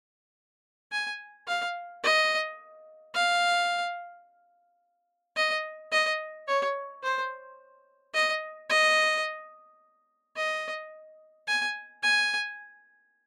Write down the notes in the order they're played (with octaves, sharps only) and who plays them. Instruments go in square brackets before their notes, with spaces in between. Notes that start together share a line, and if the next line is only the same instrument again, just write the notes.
[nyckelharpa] G#5
F5
D#5
F5
D#5
D#5
C#5
C5
D#5
D#5
D#5
G#5
G#5